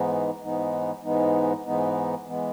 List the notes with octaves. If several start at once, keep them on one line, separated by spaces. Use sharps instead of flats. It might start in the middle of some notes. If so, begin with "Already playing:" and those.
Already playing: G#2 E3 G#3 B3 D#4
G#2 E3 G#3 B3 D#4
G#2 E3 G#3 B3 D#4
G#2 E3 G#3 B3 D#4
E3 G#3 B3